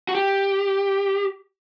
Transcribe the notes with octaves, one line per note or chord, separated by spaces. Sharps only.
F#4
G4